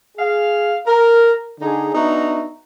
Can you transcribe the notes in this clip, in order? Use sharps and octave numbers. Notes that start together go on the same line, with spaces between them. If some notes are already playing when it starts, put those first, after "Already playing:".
G#4 F5
A#4
D3 D#4 G#4
B3 D4 D#4 F#4 E5 A#5